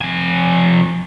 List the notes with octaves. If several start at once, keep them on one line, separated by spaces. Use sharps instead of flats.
F2 G#5